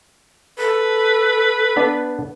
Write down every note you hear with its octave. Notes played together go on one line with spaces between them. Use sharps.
A4 B4
B3 D4 D5